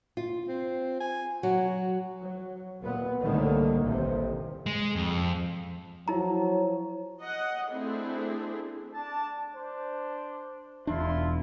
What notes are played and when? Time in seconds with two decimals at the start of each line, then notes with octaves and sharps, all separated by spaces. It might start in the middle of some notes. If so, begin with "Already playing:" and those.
0.17 F4
0.48 C4
1.00 G#5
1.43 F#3 F#4
2.21 F#3
2.79 D#2 A#2 B3
3.21 C2 A2 D3 D#3 G3 A#3
3.82 A1 D#2 C3
4.66 G#3
4.95 F2
6.08 F3 F#3 E4 C#5 A#5
7.22 D#5 F#5
7.70 A3 C4 D4 E4 G#4
8.94 D4 A5
9.55 D4 C5
10.87 E1 E2 D4 E4 F4 C6